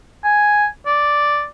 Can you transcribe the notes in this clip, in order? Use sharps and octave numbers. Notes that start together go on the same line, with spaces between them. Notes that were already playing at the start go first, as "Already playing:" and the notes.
G#5
D5